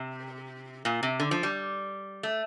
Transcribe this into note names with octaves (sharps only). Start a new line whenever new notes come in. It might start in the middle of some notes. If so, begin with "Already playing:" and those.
Already playing: C3
A#2
C3
D3
F3
G3
A3